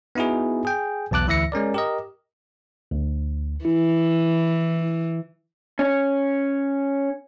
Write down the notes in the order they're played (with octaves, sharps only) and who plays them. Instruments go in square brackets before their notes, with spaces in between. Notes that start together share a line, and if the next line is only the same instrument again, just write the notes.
[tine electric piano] B3 D#4 E4 F#4 G#4
G#4 G5
B1 E2 A5 D6 F#6
D2 E3 E4 E5 A#6 C#7
G#3 C#4 A#4 D5
G4 A#4 D#5
D2
[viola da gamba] E3 [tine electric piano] E4
[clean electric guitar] C#4